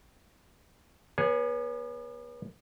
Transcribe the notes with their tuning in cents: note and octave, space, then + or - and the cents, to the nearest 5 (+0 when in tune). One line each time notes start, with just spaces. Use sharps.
B3 -35 G#4 +0 C#5 +0